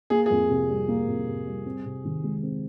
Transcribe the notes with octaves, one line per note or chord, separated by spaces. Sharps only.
A#3 G#4
F2 G#4
C3
G3
A#3
F2
C3
G3
C4
C3
D#3
G#3
C4